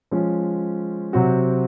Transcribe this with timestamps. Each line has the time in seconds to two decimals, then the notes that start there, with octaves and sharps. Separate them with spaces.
0.11 F3 G#3 C#4 F4
1.13 C3 F#3 C4 F#4